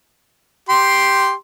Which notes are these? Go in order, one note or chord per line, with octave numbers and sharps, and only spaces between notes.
G4 C6